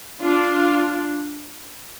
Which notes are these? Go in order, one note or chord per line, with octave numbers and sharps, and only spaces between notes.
D4 F4